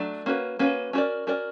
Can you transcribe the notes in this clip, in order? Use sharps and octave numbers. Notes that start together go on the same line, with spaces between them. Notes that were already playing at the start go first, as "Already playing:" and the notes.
Already playing: F#3 A3 D4
A#3 C#4 F#4 B4
A#3 C#4 F#4 B4
C#4 F#4 A#4 D5
C#4 F#4 A#4 D5